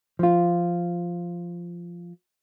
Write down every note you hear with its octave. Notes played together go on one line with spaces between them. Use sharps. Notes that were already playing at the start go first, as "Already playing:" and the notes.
F3 F4